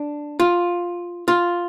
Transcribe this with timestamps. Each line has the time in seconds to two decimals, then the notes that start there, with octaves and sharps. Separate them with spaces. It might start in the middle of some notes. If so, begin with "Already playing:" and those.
Already playing: D4
0.40 F4
1.28 F4